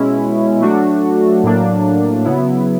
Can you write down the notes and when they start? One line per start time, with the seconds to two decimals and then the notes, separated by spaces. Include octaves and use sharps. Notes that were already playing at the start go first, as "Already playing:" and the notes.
Already playing: B2 G#3 C#4 E4
0.61 F#3 A3 D4 F#4
1.44 A2 F#3 A#3 D4
2.25 C#3 F#3 B3 E4